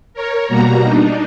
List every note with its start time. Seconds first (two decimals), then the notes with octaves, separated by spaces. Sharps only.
0.14 A#4 C#5
0.48 B2 G3 A#3 F#4 A#5
0.83 D4 D#4